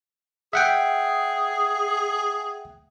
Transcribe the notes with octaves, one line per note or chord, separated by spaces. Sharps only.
G#4 E5 F#5 G5